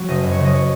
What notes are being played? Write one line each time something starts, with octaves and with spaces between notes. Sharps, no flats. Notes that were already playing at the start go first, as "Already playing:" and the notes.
Already playing: F#3
F#1 D#5
F#2
C#5
F#1
D#5
C#5